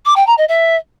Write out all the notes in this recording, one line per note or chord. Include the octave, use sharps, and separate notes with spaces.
D6
G5
A#5
D#5
E5